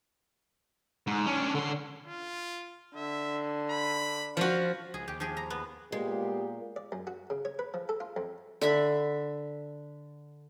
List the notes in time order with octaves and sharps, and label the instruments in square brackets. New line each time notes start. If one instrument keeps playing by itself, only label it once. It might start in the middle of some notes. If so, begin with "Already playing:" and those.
[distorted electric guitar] G#2
C#4 D4
D3 C6
[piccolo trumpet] F4
[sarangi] D3 [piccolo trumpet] E5
[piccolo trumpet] B5
[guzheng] F3 F#4 [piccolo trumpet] F5
[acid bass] C#2 [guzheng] G#4
[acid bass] D#2 [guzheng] G4
[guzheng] F3 G4 G#4
A#5
B3
[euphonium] A#2 [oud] G#3 [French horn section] B3 G4
[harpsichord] D5
F#2
F#4
C#3
C#5
B4
F3
A4
F4
F2
[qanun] D3 E5 B5